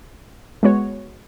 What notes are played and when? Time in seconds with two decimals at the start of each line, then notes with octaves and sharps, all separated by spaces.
0.63 G#3 B3 F#4 C#5